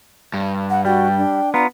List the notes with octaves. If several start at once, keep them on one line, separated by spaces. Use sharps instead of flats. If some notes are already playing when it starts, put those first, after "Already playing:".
G2
F#5
G3 F#4 G5
D4
B3 F4 A#5